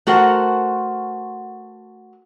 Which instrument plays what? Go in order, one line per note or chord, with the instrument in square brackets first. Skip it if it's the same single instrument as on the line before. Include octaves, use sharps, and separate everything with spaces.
[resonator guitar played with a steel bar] A3 F#4 A#4 C5 F#5